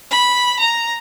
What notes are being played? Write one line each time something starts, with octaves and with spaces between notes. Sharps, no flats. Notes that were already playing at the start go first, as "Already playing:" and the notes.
B5
A#5